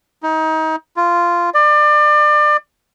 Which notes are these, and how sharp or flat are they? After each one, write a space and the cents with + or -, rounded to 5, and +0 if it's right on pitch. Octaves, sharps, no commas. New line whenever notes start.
D#4 +30
F4 -10
D5 +30